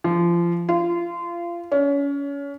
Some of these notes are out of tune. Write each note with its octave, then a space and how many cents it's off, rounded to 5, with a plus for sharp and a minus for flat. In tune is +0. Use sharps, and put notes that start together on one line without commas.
F3 -25
F4 -25
C#4 +30